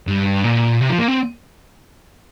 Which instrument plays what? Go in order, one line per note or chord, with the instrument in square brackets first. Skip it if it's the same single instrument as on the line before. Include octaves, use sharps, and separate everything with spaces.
[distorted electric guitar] G2
A#2
C3
F3
A#3
C4